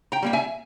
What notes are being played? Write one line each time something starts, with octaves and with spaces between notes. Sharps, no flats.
G5 A#5
G3 A#3 G5
E5 G#5